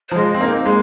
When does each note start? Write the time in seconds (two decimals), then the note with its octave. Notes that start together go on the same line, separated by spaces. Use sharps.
0.09 C5
0.12 F3
0.16 G#3 D#5
0.34 C4
0.41 A#3 D#4
0.65 G#3 A#3